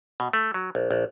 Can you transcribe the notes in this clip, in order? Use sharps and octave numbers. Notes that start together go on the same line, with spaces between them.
B2
A3
F#3
A#1
A#1